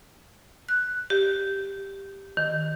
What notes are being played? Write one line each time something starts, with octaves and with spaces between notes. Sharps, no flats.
F#6
G4
D#3